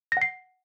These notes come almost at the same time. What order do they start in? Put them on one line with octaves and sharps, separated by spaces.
A#6 F#5 C7